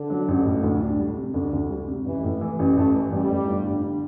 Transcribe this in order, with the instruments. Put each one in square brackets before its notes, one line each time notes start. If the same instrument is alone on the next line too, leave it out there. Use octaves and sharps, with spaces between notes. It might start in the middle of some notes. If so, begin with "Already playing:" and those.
Already playing: [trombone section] D3
[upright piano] F#3
A1
A2
D2
D4
G3
C3
[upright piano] D2 [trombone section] D3
[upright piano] D2
G3
C3
[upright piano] A1 [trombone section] E3
[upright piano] A2
E3
A1
[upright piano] A1 [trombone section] A3
[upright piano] E3
[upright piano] A1 [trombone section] G3
[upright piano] A2
G1
D3
D3